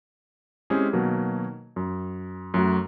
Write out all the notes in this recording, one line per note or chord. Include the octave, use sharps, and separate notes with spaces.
G#3 C4 C#4 E4 G4 G#4
B2 D#3 F#3 A#3
F#2
F#2 F#3 A3 F#4